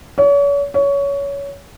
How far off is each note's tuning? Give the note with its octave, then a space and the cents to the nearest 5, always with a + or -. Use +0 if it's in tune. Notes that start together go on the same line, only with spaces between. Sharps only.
C#5 +40
C#5 +20